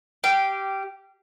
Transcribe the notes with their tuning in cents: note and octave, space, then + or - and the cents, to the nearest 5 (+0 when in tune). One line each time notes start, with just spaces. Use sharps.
G4 -10 F5 -30